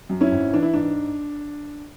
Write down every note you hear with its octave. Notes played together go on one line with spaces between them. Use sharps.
F#2
C#4 E4
G#1
E3 D4
E4
G#2 D4